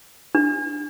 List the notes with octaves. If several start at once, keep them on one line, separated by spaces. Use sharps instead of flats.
D4